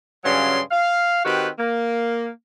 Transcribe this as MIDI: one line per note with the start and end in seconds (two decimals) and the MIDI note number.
0.24 0.60 43
0.24 0.60 49
0.24 0.60 54
0.24 0.60 61
0.24 0.60 84
0.71 1.20 77
1.24 1.48 51
1.24 1.48 60
1.24 1.48 66
1.24 1.48 67
1.24 1.48 71
1.59 2.28 58